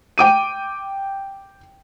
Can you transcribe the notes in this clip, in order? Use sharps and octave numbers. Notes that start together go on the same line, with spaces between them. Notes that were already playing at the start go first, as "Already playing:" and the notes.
G5 D6 D#7